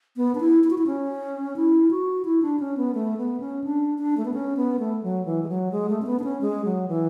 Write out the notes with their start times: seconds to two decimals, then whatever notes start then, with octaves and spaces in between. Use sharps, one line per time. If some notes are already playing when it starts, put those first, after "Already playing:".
0.17 B3
0.35 D4
0.40 E4
0.64 E4
0.70 F#4
0.78 E4
0.86 C#4
1.56 E4
1.91 F#4
2.25 E4
2.42 D4
2.60 C#4
2.77 B3
2.94 A3
3.17 B3
3.40 C#4
3.64 D4
3.98 D4
4.17 A3
4.25 B3
4.34 C#4
4.57 B3
4.79 A3
5.03 F#3
5.25 E3
5.43 G#3
5.49 F#3
5.72 G#3
5.89 A3
6.02 C#4
6.06 B3
6.19 D4
6.24 C#4
6.41 G#3
6.65 F#3
6.88 E3